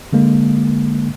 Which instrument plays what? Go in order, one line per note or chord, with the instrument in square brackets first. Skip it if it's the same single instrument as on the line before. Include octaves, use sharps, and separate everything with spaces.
[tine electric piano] D3 G#3 A#3